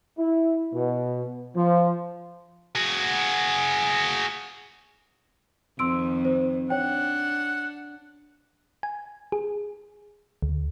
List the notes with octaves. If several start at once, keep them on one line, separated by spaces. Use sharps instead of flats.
E4
B2
F3
F#4 G#4
F2 D#3 C6 E6 D7
C5
D4 C#5 F#5 G5
G#5
G#4
D2